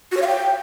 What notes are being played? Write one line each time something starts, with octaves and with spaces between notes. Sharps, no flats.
F#4
C#5
F5
G5